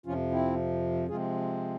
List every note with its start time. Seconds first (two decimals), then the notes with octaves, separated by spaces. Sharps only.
0.06 F2 C3 F3 C#4 F4
0.31 C4 E4
1.08 C3 F3 G#3 C4 F4 G#4